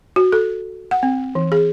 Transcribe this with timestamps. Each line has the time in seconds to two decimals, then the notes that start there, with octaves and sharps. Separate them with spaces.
0.16 F#4
0.32 A4
0.91 F#5
1.03 C4
1.35 E3
1.52 G#4